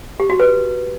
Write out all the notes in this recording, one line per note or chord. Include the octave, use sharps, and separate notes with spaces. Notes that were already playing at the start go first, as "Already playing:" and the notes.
G4
F#4
B4